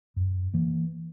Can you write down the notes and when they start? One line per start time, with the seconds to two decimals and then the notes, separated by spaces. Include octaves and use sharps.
0.16 F#2
0.54 E3 A#3